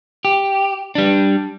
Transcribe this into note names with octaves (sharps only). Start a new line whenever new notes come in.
G4
G3 D4